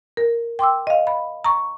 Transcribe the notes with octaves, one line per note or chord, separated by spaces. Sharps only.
A#4
G5 C6 D6 E6
D#5 F5
B5
A#5 C#6